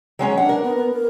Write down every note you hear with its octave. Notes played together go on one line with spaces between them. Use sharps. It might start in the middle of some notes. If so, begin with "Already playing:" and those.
F#3 G#3 C#4
D4 F#5
A#4
B3
B3
A#4